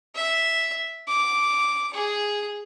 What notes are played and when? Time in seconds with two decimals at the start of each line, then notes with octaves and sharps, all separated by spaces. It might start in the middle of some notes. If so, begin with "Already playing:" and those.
0.15 E5
1.09 D6
1.93 G#4